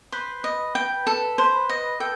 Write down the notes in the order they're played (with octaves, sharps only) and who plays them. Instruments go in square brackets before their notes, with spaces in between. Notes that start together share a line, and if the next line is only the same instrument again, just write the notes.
[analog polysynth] B4 [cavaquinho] C5
[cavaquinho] D#5
G5
A4
[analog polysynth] B4 [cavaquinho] C5
[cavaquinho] D#5
[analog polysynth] A4 [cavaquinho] G5